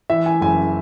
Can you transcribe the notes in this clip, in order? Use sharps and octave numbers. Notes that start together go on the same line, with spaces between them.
E3 E5
E3 G#5
F#1 G#5